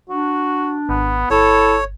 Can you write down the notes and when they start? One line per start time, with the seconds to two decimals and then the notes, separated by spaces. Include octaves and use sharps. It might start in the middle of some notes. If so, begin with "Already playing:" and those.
0.09 D4 F#4
0.89 G#1 B3
1.30 G1 E4 A4 C#5